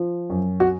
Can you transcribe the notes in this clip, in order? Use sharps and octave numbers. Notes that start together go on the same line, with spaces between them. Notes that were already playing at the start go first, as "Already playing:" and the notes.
Already playing: F3
F#2
F#4